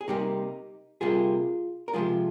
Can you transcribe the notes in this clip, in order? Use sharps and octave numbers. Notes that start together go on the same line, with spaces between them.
G#4
C3 G3 A#3 D#4 G4
C3 G3 A#3 F4 G#4
A#4
C3 F3 G#3 F4 G#4